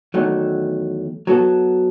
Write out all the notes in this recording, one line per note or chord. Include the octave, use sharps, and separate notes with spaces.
E2 D#3 F#3 A3
F#3 B3 F#4 A4